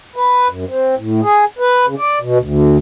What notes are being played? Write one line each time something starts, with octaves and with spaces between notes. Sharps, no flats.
B4
F#2
C4
A2
G#4
B4
C#3
D5
B2
D2